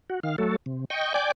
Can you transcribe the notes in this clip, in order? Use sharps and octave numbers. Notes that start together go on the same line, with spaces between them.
F#4
D#3 F5
F#3 A3 A4
C3
D#5 G5 C#6
D5 G5 G#5 D6